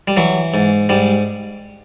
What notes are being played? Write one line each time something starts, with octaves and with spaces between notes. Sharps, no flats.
G3
E3 F#3
G#2
G#2 G3